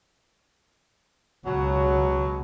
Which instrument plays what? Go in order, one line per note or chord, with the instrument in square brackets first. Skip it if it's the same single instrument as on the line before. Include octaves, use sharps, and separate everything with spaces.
[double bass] C#2 [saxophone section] B2 F#3